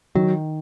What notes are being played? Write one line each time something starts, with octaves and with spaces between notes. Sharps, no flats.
D#3 F#3